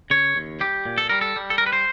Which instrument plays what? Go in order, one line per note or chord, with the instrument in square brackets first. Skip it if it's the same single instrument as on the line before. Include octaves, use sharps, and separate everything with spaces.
[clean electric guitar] C#3 C#5
D#2
G3 G4
A#2
A4
G3 A#4
A4
G3
A4
G3 A#4
B4
C5